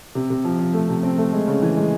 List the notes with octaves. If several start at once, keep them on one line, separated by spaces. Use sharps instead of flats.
C3
C3
F3
F3
A3
C3
C4
A3
G#3
C#3
E3
G#3